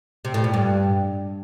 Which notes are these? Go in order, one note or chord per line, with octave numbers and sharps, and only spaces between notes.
C3
A2
A#2
G2